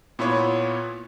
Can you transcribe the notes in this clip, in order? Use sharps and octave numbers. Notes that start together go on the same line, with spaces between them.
A#2 B3 E4 F4 B4 C#5